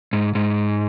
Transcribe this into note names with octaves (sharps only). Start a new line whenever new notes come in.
G#2
G#2